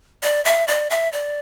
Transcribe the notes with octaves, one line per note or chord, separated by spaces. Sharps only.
D5
E5
D5
E5
D5